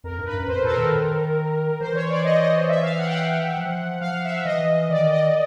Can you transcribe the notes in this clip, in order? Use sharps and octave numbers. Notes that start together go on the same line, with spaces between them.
F2 A#4
G2
B4
F#2
F2 C5
A#2 A4
A#4
D#3
E3 C5
C#5
D5
D#5
D#5
E5
F5
F#5
G5
F#5
F3
F3 F5
E5
E3 D#5
D#3 D5
D#5